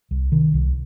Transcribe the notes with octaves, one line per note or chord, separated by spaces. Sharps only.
C2
C3 D#3
C2